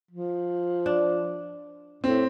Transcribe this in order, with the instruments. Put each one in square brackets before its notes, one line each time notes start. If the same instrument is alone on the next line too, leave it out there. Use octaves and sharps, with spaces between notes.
[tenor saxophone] F3
[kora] D4
[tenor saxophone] A2 [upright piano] C4